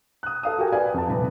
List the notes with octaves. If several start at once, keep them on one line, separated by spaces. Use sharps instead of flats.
D#6 F#6
A4 F5 D#6
F#4 G4 A4 A#4 G5 G#5
B4 D5 F5 G#5
F2 A5
D#1 C3 B4